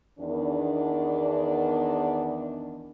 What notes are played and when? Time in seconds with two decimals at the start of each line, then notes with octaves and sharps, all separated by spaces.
0.19 E2 D#3 D4